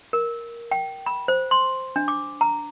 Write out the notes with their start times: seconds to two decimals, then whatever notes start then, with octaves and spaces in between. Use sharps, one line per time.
0.13 A#4
0.71 G5
1.06 B5
1.28 C5
1.51 C6
1.96 D4
2.08 D6
2.41 A#5